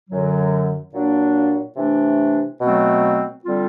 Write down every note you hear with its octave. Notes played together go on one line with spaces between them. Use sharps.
F#2 D3 F#3
A#2 F#3 A#3 D4
C3 E3 A3 D4
B2 F#3 A3 C4
D3 G3 C4 F4